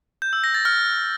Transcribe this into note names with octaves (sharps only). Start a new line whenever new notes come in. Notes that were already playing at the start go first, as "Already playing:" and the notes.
G6
E6
A#6
A6
F6